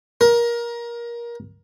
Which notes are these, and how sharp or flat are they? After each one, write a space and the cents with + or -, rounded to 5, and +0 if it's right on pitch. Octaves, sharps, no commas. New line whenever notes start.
A#4 +20